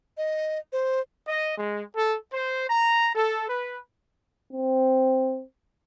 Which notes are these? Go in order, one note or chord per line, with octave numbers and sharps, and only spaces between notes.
D#5
C5
D#5
G#3
A4
C5
A#5
A4
B4
C4